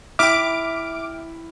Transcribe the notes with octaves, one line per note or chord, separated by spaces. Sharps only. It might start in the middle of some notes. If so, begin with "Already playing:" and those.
E4 E5 G5 D6 F6 D7